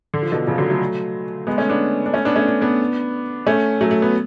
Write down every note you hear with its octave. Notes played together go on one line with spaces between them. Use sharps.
D3
F3
B2 D3
C#3 F3
D3 F#3
F#3 A3
G#3 B3
A3 C#4
B3 D4
D4
A3 C#4
B3 D4
A3 C#4
D4
B3 D4
A3 C#4
F#3 A3
A3
B3